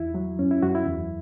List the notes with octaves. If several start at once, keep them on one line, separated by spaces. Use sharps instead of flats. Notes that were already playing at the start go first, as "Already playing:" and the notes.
Already playing: E2 E4
F#3
F#2 C#4
E4
F#2 F#4
E4
E2